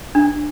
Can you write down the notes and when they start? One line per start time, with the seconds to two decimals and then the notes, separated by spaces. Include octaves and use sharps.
0.15 D4